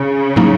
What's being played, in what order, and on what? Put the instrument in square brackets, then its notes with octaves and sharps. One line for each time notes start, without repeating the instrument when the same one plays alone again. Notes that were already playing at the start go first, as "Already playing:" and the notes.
Already playing: [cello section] C#3
[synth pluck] A2 F#3 A#3 D#4